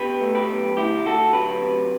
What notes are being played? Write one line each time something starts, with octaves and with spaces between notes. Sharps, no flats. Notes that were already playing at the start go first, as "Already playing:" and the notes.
Already playing: B2 G4 B4
A3
G4 B4
B1
D2 E4 G4
D2 F#4 A4
F#3 G4 B4
C3